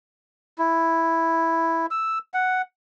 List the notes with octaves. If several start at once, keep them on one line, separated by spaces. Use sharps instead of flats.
E4
E6
F#5